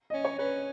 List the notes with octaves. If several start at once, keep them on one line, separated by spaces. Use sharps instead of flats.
C#4 D#5
C#5
C#4 B4